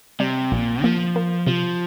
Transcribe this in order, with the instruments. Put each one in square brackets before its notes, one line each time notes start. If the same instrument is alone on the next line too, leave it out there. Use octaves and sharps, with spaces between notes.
[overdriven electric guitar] C3 [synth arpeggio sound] G3
[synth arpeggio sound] A#1 [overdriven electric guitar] A#2
[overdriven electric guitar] F3 [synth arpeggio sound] A#3
[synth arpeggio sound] A#3
[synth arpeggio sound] C3 [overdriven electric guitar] F3